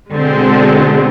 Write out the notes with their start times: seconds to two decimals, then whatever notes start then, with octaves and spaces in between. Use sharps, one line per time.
0.11 B2 D3 G#3 C4